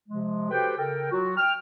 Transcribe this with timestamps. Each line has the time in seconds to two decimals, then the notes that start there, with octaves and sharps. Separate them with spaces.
0.09 C3 F3 G#3
0.51 F#4 G4 A4 B4 C5 G5
0.78 C#3 A4 A#4 G5
1.11 F#3 F4 F#4
1.37 G5 F6